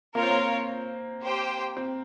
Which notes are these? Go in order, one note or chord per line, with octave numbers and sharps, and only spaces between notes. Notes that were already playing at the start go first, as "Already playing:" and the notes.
A#3 F4 A#4 C#5
C4
A#3
G4 C5 G5
C4